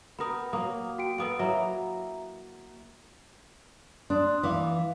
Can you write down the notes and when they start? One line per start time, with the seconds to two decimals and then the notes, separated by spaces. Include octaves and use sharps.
0.19 B3 A#4 G5 B5 D#6
0.53 F#3 A#3 D#6
0.98 F#4 G5 D7
1.18 A#3 B3 A4 B4 D#6 D7
1.39 F#3 A#3 E4 E5 A#5
4.10 D4 C6 D#6 F#6
4.43 E3 E4 B4 F5 D6